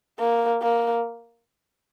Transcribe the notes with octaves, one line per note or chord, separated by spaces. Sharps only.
A#3
A#3